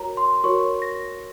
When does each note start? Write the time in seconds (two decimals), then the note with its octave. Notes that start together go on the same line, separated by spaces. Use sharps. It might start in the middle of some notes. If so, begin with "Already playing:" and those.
Already playing: F#4 A#4 C#5 A#5
0.17 C6
0.44 F#4 A#4 C#5 C#6
0.82 A#6